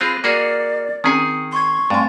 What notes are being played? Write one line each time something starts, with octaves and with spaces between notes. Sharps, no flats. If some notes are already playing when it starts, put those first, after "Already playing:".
C4 F4 G#4 B5 F#6 A#6
A#3 F#4 G#4 A#4 D5 F6 C#7
D#3 C4 C#4 G#4 G#5 D#6 C#7
C6 C#6 G#6
G2 A3 C4 G#5 C6 A6